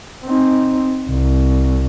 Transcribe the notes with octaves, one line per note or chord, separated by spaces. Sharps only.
C4 D#4
C2